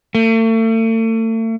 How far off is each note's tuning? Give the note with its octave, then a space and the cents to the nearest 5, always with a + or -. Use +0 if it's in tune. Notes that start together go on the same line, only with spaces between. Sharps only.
A3 +40